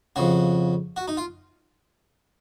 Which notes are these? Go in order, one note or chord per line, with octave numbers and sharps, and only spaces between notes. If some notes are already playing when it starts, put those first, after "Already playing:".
F2 C#3 F#4
F#4
D#4
F4